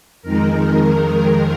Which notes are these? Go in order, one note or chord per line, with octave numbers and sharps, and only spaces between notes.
F2 D#3 G#3 A#4